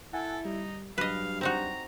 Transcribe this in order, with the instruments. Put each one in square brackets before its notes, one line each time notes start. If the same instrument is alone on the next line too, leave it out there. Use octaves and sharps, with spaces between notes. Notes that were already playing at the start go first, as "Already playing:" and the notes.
[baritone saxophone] E4 [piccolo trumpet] A4 [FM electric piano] F#5 G#5
[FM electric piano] G3 [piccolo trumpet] D#4
[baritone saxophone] G2 [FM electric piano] F#3 [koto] B4 D#5 [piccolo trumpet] F5
[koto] C4 D#4 F#4 [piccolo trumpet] A#5